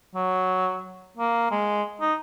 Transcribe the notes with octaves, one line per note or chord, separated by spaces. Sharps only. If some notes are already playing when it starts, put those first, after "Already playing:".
F#3
A#3
G#3
D#4